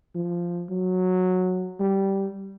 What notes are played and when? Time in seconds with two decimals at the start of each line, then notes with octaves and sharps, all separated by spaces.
0.15 F3
0.70 F#3
1.80 G3